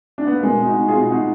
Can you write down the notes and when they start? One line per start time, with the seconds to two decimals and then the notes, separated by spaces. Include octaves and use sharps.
0.18 D4
0.27 B3
0.35 A#3
0.43 B2 G#3
0.60 B2
0.66 D#4 F#4
0.77 B2
0.88 F4 G#4
0.94 B2
1.11 B2 D#4 F#4